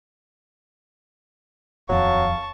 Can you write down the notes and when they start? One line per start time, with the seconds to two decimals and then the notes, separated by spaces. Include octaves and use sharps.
1.89 D#1 F2 F#3 F5 A5 C#6